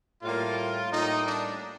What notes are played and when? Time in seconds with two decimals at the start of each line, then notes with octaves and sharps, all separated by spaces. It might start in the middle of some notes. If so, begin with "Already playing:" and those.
0.22 A2 G3 A#3 F4
0.92 A2 G3 A#3 D#4
1.27 D4